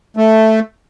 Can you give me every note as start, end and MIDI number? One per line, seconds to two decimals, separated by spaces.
0.17 0.60 57